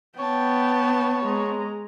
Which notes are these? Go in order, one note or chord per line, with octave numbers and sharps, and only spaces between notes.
B3 C#5 G5 A5
G#3 A#5